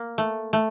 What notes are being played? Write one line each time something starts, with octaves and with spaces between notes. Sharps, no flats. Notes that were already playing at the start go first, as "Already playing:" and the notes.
Already playing: A#3
A3
A3